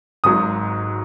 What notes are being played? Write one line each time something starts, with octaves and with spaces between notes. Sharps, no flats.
G#1 G#2 F#3 D#6